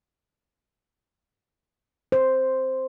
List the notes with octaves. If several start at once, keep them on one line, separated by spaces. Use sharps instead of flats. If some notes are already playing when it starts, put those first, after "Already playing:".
C5